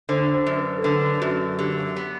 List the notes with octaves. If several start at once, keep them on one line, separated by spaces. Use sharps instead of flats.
D3 C5
C5
F#2
B4
A4
D3 B4
F#2 F#4
D3 G4
B3